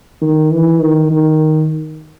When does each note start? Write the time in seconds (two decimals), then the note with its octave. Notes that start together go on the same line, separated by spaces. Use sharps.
0.21 D#3
0.51 E3
0.81 D#3
1.11 D#3